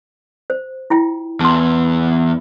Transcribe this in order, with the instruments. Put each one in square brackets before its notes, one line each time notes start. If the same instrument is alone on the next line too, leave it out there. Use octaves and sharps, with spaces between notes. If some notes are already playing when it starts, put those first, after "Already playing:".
[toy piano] C5
E4 F4 G5
[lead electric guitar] E2 [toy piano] A5 C6